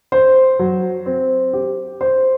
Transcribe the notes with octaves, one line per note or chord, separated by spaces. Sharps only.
C5
F#3
C4
G4
C5